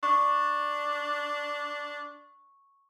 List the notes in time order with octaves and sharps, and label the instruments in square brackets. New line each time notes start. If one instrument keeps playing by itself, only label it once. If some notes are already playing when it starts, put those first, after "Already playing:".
[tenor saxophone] D4 [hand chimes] C#6